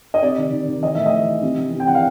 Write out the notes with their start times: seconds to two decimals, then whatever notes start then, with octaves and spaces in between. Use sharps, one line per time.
0.14 D#5
0.23 C3 D5
0.38 D#3
0.52 D#3
0.68 D#3
0.82 E3 D#5
0.95 A2 E5
1.06 D#5
1.13 E3
1.28 E3
1.42 C3
1.58 E3
1.73 C3
1.80 G5
1.87 E3 F#5
1.95 F5